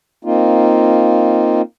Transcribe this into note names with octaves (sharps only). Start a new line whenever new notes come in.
A#3 C4 D#4 F4